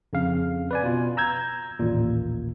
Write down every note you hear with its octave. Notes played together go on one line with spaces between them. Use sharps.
F2 C#3 F5
B4 D5 G#5
B2 F4
A#5 E6 G6 G#6
A1 D#2 A#2